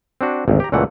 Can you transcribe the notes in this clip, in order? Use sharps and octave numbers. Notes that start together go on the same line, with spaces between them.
C4 D4 F#4
G#1 D2
G4 A#5
C#2 A#2 E3 A3 F#5